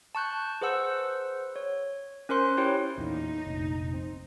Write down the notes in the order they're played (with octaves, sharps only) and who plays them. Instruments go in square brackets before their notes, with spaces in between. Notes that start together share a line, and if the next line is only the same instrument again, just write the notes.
[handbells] A5 C#6 F#6 G6
G#4 B4 C5 F#5 E6
C#5
C#4 A#4 C5 C6
E4 G4 C#5 G5
[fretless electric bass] E2 A#2 [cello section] D#4
[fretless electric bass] F1 A#1
C4